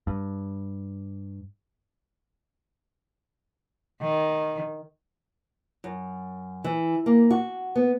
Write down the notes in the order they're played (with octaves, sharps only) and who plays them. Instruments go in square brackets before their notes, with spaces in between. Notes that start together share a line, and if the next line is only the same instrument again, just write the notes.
[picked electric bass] G2
[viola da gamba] D#3
[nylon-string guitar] F#2
E3
A#3
F#4
B3